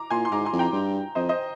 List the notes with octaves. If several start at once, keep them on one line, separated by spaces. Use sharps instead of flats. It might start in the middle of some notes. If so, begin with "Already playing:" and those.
Already playing: A#5 D6
A#2 G#5 C6
C6
G#2 A#5 D6
G#5 C6
F2
G5 A#5
G2
F2 C5 D#5
C5 D#5